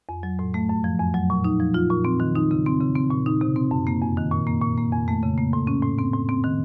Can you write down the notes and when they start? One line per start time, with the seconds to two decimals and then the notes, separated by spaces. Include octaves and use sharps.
0.09 F2
0.23 F#3
0.39 A2
0.54 A3
0.69 F#2
0.84 F3
1.00 F2
1.14 F#3
1.30 A#2
1.44 D#4
1.60 F3
1.74 F4
1.90 A#2
2.05 C4
2.20 D#3
2.35 D#4
2.51 C#3
2.66 C4
2.81 C#3
2.96 C4
3.11 A#2
3.26 D#4
3.41 C3
3.56 C4
3.71 F#2
3.87 A#3
4.02 F2
4.17 D#3
4.32 A#2
4.47 A#3
4.62 A#2
4.78 A#3
4.92 F2
5.08 A3
5.23 C#3
5.38 A#3
5.53 A2
5.67 C#4
5.82 A2
5.99 C4
6.13 A2
6.29 C4
6.44 D#3